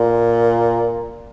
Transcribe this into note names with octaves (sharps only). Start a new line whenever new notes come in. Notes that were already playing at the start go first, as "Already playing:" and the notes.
Already playing: A#2